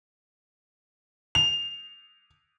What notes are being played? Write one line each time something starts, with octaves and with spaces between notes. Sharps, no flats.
F7